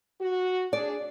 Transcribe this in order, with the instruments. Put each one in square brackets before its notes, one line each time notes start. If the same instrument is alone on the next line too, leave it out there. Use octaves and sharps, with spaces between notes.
[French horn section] F#4
[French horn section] D4 G#4 [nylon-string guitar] D5